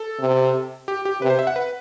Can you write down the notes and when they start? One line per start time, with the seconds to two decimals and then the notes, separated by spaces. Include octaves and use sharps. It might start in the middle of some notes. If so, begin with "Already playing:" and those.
Already playing: A4
0.20 C3
0.88 G4
1.05 G4
1.22 C3 B4
1.30 C5
1.39 E5
1.47 F#5
1.56 B4